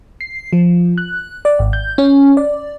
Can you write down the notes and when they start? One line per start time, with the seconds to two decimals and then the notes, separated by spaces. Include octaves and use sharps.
0.21 C7
0.53 F3
0.98 F#6
1.45 D5
1.59 G#1
1.73 G6
1.98 C#4
2.37 D5